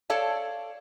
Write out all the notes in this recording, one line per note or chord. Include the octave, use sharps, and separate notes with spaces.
A4 C#5 D5 F5 A5